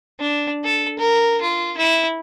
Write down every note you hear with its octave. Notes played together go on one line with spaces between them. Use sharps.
D4
A4
A#4
F4
E4